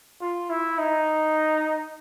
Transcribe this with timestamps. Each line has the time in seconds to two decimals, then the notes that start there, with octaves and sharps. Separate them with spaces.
0.21 F4
0.50 E4
0.79 D#4